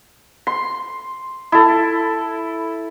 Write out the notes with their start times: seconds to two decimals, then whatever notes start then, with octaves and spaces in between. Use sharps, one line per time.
0.47 C6
1.52 E4 A4